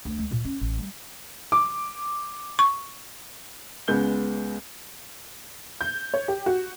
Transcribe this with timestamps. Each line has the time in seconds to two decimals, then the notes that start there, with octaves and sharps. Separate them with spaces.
0.05 D2
0.18 G#3
0.31 A#2
0.44 C#4
0.61 A1
0.78 G3
1.52 D6
2.59 C#6
3.88 C#2 G#3 B3 G6 G7
5.81 G6
6.14 C#5
6.28 G4
6.46 F#4